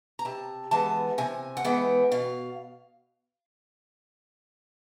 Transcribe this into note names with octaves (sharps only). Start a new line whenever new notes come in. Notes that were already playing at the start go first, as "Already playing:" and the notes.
A#5
C3 A5
E3 G#3 B3 A5
C3 G#5
F#5
E3 G#3 B3 G5
B2 F5